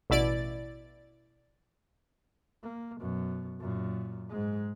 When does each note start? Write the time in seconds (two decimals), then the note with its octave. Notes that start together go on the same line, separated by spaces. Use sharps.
0.10 A1 B2 E4 D5 A6
2.64 A#3
3.00 F#2 B2
3.60 F#2 A#2
4.30 G#2 G#3